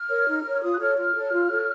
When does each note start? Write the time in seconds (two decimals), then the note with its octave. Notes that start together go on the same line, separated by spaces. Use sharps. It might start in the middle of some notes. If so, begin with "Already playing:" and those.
Already playing: F6
0.09 A#4 C#5
0.26 D#4
0.44 A#4 C#5
0.62 F4 D#6
0.73 F#6
0.79 A4 C#5 F6
0.97 F4 F6
1.15 A4 C#5
1.32 F4
1.50 A4 C#5